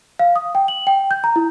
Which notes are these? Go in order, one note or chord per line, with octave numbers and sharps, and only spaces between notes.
F5
D#6
G5
F#7
G5
G6
A#5
E4